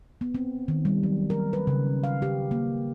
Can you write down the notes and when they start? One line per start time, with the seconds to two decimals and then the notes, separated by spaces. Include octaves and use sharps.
0.21 B3
0.35 C4
0.68 D#3
0.85 G3
1.03 F#3
1.30 A#4
1.53 B4
1.67 C#3
2.04 F5
2.22 G4
2.51 A#3